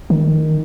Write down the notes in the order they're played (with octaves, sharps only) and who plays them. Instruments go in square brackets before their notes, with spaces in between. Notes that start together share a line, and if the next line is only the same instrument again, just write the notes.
[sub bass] D#3